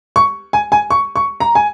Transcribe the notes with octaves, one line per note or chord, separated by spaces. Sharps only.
C#6
G#5
G#5
C#6
C#6
A#5
G#5